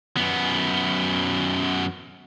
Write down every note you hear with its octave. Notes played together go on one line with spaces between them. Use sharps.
F#2 B3